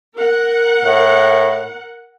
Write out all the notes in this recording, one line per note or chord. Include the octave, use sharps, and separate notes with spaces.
A#4 F#5
A2